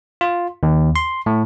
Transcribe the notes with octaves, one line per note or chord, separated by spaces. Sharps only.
F4
D#2
C6
A2